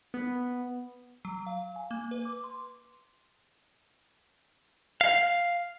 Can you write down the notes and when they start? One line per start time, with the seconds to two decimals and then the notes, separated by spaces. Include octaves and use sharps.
0.14 B3
1.25 F#3
1.47 F5
1.76 G#5
1.91 A#3
2.11 B4
2.25 D6
2.44 C6
5.01 F5